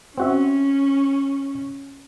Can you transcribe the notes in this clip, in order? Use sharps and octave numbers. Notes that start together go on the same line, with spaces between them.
C4 C#4 F#4 E5